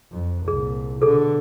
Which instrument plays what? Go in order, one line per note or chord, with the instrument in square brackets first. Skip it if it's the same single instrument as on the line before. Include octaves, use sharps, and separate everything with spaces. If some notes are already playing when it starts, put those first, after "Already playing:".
[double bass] F2
[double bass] C2 A#2 [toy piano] G#4
[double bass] B2 D3 [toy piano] G#4 A4